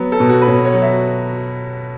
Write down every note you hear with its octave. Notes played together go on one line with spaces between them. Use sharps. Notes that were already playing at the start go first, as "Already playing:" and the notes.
Already playing: F#3 B3
A4
B2
F#4
B4
B2 C#5
C#5
F#3
E5